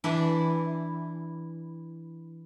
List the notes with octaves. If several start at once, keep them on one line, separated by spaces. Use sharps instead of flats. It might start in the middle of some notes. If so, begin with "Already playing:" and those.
E3 D4 E4